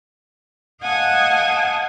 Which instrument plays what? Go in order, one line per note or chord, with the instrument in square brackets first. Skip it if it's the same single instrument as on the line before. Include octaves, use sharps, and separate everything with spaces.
[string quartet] D#5 F5 F#5 G#5 A5 D#6